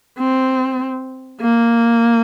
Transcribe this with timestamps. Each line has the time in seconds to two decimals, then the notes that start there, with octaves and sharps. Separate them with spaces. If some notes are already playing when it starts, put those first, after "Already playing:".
0.19 C4
1.41 A#3